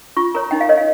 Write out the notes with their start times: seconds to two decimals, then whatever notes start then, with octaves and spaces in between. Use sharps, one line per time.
0.17 F4 C#6
0.35 A#4 C#5 A#5
0.51 D#4 G5
0.61 F5
0.69 A#4 C#5 D#5
0.77 F5